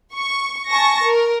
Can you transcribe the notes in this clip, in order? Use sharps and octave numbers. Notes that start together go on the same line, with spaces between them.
C#6
G#5 A5 C#6 A#6
A#4